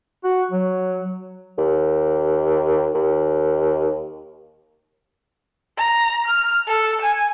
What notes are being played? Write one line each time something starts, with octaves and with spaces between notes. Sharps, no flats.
F#4
F#3
D#2
D#2
A#5
F6
A4
G#5